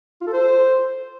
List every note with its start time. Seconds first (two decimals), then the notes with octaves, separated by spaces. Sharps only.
0.21 F4
0.27 A4
0.33 C5